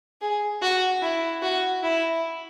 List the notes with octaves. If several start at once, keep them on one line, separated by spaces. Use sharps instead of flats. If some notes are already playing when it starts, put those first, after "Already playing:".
G#4
F#4
E4
F#4
E4